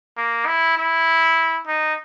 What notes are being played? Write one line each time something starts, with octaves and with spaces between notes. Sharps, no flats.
A#3
E4
E4
D#4